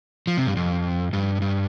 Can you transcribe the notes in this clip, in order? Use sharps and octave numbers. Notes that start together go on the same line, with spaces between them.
F3
C3
G2
F2
G2
G2